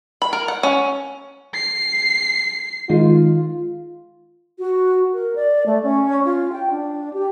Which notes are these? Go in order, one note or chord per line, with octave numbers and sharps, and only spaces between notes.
B5
A#4
F#5
C#4
C7
D#3 G#3 D#4 F4
F#4
A#4
D5
A3
C#4
F4
G5
D4
G4